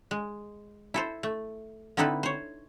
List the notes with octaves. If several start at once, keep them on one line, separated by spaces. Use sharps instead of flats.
G#3
E4 A4 C5
A3
D3 C4 D#4 E4 A4 B4
C5 C#5